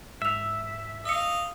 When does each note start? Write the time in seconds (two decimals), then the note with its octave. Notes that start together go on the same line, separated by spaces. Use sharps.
0.22 G#2 E5 E6 F7
1.05 D#5 F5 E6 C#7